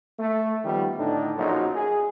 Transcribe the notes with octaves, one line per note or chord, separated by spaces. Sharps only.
A3
D#3 F3 G3 B3
A2 D3 D4 D#4
A#1 F#2 F#3 D#4
G#4